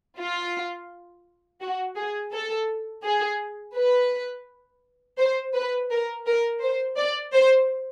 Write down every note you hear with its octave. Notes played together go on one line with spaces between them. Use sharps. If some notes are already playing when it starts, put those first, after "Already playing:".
F4
F#4
G#4
A4
G#4
B4
C5
B4
A#4
A#4
C5
D5
C5